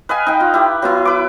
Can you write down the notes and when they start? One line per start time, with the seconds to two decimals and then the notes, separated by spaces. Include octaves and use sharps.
0.09 B4 D#5 F5 G#5
0.27 D#4 G5
0.40 F4
0.54 E4 G4
0.82 F#3 B3 E4
1.05 B4 D6